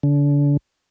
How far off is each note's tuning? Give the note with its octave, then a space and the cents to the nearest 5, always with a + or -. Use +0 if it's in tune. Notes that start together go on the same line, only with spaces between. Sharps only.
D3 -35